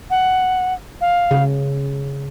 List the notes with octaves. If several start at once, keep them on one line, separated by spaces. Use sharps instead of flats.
F#5
F5
C#3